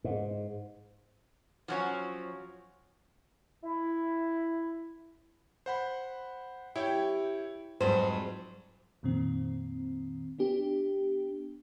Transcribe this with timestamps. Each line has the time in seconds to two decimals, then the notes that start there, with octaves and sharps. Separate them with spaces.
0.04 G#2
1.68 F3 F#3 C#4
3.63 E4
5.66 C5 F#5 B5
6.76 E4 G4 C#5 G5
7.81 F2 G#2 F#3 C5
9.03 F2 A#2 D#3 C4
10.39 B3 D4 G4